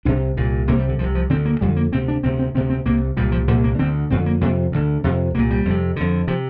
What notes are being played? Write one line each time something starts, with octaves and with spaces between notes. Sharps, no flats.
C2 C3 D4
C2 A#2
C2 C3 A#3
G3
D3
C2 C3 F3
F3
D2 D3 C4
A#3
F2 D3 G3
A#3
D2 C3 C4
D4
D2 C3 C4
C4
D2 C3 C4
C4
C2 C3 A#3
C2 A#2 G3
F3
C2 A#2 F3
A#3
D2 D3 C4
F2 D3 C4
A#3
F2 C3 A#3
D2 D3
F2 C3
C2 A#2 A#3
G3
F2 C3
F2 D3
C3 F3